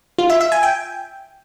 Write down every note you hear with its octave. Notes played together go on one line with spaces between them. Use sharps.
F4
E5
E5
G#5
G5